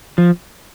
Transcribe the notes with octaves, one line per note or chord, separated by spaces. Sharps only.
F3